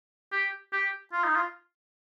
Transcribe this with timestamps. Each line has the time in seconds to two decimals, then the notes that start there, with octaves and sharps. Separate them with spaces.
0.32 G4
0.73 G4
1.13 F4
1.24 D#4
1.36 F4